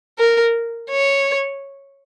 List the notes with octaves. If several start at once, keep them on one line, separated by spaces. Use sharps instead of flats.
A#4
C#5